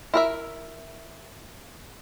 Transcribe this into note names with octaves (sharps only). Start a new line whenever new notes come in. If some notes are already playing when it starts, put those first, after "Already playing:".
E4 A#4 E5